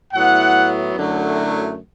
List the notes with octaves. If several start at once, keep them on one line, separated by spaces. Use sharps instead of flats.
A2 F#3 B3 E4 F#5
F#2 D3 F#3 A3 E4